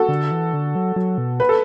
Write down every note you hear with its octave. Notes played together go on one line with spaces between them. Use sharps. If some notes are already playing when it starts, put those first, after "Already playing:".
Already playing: F#4 A4
D3
E3
D3
F#3
F#3
B2
B4
A4